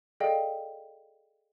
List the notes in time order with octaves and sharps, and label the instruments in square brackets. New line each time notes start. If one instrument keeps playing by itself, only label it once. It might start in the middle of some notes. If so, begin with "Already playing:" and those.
[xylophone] G#4 A4 D5 D#5 F5 G5